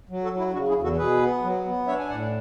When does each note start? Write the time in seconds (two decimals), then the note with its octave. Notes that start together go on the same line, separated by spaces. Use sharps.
0.09 F#3
0.23 F#4 A4
0.31 F#3
0.38 E4
0.53 C#3 D4 F#4
0.68 E4 G#4
0.76 E2
0.83 F#4 A4
0.97 B2 G#4 B4
1.20 B3
1.42 F#3
1.64 B3
1.87 D4 C#5 E5
1.99 G#5
2.09 A2 D5 F#5